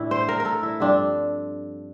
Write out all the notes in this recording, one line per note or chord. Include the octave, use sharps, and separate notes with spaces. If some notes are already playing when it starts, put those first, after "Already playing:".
Already playing: A2 E3 A3 D4 E4
C5
A#4
A#4
A4
E4
G2 F3 C4 D4